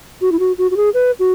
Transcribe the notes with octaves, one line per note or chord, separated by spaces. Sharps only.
F#4
E4
F#4
F#4
F#4
G#4
B4
F#4